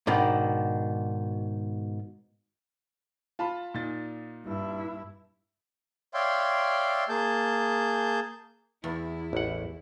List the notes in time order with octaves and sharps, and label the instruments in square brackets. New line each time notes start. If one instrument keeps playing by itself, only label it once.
[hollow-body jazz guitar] G#2 B2 D#3 D4
[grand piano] F4 A5 B5
A#2 D#4 A6
[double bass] G2 E4
[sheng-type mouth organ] C#5 D5 E5 F5 G5 C6
A#3 G#4 A5 G6
[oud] E2 [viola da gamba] E4
[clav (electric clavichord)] A1 F#5